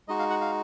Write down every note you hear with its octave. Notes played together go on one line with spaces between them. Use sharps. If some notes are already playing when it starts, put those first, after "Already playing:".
G#3 D#4 F#4 D#5
F5
F#5
F5